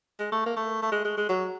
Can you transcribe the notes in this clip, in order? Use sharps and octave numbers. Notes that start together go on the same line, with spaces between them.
G#3
A3
A#3
A3
A3
G#3
G#3
G#3
F#3